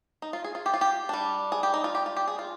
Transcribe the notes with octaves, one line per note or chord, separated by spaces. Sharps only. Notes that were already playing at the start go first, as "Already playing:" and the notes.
D#4
F4
G#4
F4
G4
F4
G4
G3 D4
G#4
G4
D#4
F4
G4
F4
G4
G#4
F4